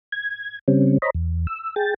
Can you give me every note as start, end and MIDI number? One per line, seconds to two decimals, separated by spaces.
0.12 0.59 92
0.68 0.98 49
0.68 0.98 55
0.68 0.98 60
0.68 0.98 61
1.02 1.10 72
1.02 1.10 73
1.02 1.10 75
1.02 1.10 82
1.02 1.10 83
1.15 1.47 40
1.47 1.75 88
1.76 1.94 68
1.76 1.94 79
1.76 1.94 93